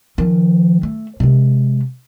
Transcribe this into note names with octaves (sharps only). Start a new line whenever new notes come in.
D#3 F3
A3
C3 G#3